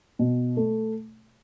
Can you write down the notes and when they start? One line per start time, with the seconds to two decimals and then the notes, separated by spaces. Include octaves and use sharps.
0.19 B2
0.57 A3